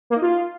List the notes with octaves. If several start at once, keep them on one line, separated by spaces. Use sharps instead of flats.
A#3
D#4
F4